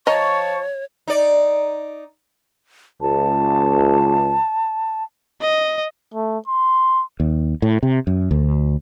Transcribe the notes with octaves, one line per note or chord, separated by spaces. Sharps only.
F3 C#5 D#5 A5 A#5 C#6
D#4 D5
C#2 A5
D#5
A3
C6
D#2
A2
C3
F#2
D2